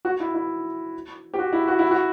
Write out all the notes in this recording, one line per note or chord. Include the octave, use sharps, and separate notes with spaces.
F#4
E4
E4
G4
F#4
E4
F#4
E4
F#4